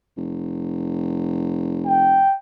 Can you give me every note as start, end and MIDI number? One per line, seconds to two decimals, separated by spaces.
0.17 2.31 29
1.87 2.35 79